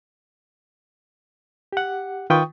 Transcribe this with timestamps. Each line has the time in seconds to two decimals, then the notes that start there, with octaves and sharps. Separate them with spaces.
1.73 G4 F#5
2.30 D#3 F4 B4 G5 C#6 D#6